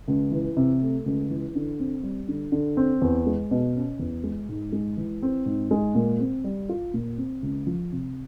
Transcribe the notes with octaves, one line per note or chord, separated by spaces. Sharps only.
C#2
E3
C3
A3
C#2
E3
D3
C4
G3
D3
D3
C4
E2
G#3
B2
C#4
E2
G#3
G#2
G#3
E3
C4
G#2
G#3
A#2
C4
G3
F4
A#2
C4
C#2
F3
C3